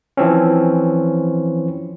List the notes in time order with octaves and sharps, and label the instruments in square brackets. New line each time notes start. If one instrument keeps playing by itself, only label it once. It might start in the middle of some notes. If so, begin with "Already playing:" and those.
[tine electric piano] E3 F3 C4 C#4